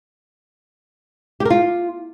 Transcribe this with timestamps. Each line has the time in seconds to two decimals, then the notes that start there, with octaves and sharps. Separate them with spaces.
1.40 G4
1.45 A#4
1.50 F4